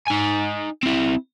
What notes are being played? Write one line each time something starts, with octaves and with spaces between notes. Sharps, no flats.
D#4 G#5
C4 E4